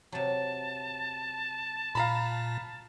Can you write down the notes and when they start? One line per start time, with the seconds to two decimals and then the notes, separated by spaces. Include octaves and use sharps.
0.12 C3 F#3 A5
1.95 A#2 F5 A#5 B5